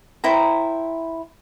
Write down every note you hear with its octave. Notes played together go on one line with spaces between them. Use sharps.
E4 C5 G5 A#5